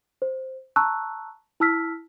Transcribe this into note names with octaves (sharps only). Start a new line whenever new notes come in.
C5
A5 A#5 C#6 E6 F#6
E4 A5 E6 F6 B6